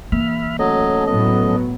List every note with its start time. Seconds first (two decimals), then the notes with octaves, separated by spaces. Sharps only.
0.12 E3 A#3 E5 B5 F6
0.59 F#3 A3 C#4 A4 D#5
1.07 A2 F#3 B3 D#5